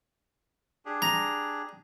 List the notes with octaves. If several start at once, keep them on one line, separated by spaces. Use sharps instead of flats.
D4 G4 G#4
A#5